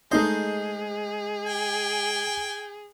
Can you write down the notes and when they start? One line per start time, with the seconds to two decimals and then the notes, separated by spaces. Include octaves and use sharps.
0.11 G#3 A3 D#4 G#4 C5 D#5
1.46 G5 G#5